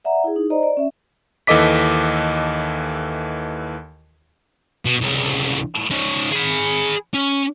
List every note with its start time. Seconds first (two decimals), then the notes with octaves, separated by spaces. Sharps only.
0.05 D5 E5 F#5 A#5
0.24 E4 G#4
0.36 D#4
0.50 C5 D5 D#5 A#5
0.63 D5
0.77 C#4 E5
1.47 D#2 E3 A4 D#5 D6 B6
4.85 B2
5.01 C2 C#3
5.91 C#4 D#4
6.31 G#4 B5
7.14 C#4